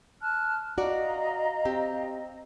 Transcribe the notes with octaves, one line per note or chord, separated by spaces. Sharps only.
A5 F6 F#6
F#4 D5 D#5 F5 A#5
C4 G4